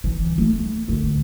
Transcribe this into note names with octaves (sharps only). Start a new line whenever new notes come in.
E3
A3
D2